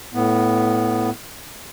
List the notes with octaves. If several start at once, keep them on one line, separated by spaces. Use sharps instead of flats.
A2 B3